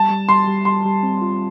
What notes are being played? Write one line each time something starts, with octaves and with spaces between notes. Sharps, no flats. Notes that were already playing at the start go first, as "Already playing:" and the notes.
Already playing: G3 A5
G3
G3 C6
G3
G3 C6
G3
C4
F4